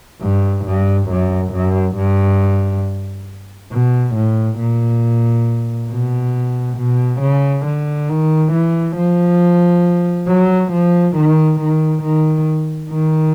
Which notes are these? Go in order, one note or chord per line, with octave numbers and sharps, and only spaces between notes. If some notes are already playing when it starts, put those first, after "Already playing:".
G2
G2
F#2
F#2
G2
B2
A2
A#2
B2
B2
C#3
D3
D#3
E3
F3
F#3
F3
D#3
D#3
D#3
D#3